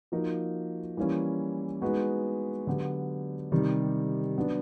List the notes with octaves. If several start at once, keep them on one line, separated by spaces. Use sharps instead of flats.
F3 A#3 D#4 F#4 A#4
E3 G3 A#3 C#4 E4
G#3 B3 D#4 F#4 B4
D3 F#3 B3 D4 G4
C3 D#3 G3
F#3 B3 D4